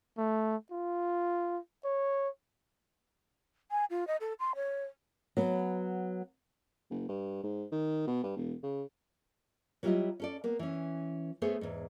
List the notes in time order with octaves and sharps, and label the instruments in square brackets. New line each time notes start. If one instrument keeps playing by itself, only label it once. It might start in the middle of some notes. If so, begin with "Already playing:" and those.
[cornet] A3
F4
C#5
[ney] G#5
F4
D#5
A4
C6
C#5
[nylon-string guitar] F#3 B3
[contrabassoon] F#1
G2
G#2
D#3
B2
G2
E1
C#3
[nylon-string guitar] F#3 G3 E4 F4 G4 D#5
C#4 A4 D5
A#3 B3
E3 C#4
A3 B3 G#4 C5 C#5
E2 G#2